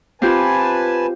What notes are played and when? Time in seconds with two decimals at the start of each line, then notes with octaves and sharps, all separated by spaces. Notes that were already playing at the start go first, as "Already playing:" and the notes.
0.22 C4 F4 G4 B4 G#5 A5